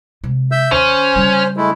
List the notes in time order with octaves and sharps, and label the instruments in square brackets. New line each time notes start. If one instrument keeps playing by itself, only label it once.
[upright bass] C3 G#3
[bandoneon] E5 E6 G6
[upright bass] D#2 [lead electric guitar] C#4 [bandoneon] C5
[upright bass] C#3 G3
[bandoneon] G#3 A3 E4